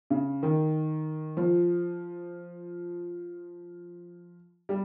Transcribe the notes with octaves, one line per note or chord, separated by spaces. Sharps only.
C#3
D#3
F3
G3